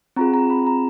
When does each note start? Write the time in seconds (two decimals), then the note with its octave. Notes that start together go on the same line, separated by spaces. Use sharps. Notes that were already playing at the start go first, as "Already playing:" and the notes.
0.16 C4 F4 G#4 A#5
0.34 A#5
0.50 B5
0.67 A#5